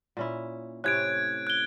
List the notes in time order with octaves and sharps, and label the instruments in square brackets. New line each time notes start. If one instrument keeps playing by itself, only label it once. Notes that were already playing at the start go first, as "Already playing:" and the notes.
[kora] A#2 C#4 E4
[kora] A2 C3 C#4 [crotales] F#6 G#6 D7
[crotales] F#6 G7